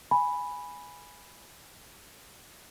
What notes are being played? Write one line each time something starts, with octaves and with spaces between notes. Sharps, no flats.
G#5 B5